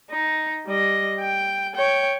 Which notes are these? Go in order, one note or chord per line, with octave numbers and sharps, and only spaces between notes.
D#4
G3 D#5
G5
C#5 G5